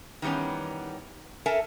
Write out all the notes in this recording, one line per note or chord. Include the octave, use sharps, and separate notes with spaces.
D#3 E3 G3 B3 C#4
A4 A#4 E5 G#5 A5